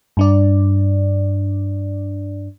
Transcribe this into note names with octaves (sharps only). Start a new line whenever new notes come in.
G2 D4 D5